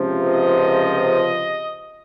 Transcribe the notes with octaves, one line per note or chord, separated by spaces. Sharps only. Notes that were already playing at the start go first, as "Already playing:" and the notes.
Already playing: C#2 C3 F3
D#5